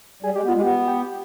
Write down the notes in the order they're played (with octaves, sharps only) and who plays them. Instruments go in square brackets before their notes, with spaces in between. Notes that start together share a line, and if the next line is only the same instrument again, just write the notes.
[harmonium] G3 [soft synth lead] G#4
[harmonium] G#3 [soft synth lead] G4
[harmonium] B3
[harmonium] G#3 [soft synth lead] F4
[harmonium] B3 [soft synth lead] G4
[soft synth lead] G4